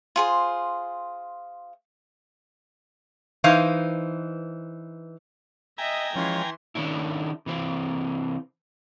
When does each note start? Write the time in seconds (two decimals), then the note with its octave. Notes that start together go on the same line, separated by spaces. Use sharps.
0.16 F4 G#4 C5
3.44 E3 D#4 C5 F5
5.78 D#5 E5 G5 G#5 A#5
6.15 E3 F3 G#3 C#4 F4 C#5 C6
6.75 D#3 C#4 D4 E4
7.46 C3 E3 C4